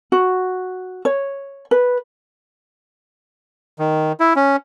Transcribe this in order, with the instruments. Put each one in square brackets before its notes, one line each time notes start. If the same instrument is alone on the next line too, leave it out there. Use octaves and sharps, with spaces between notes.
[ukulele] F#4
C#5
B4
[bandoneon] D#3
E4
C#4